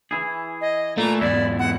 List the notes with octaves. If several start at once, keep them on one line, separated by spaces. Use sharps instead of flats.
E3 E4 G#4
D#5
A#2 E3 A3 A#5
E2 G#2 E4 D5
F#5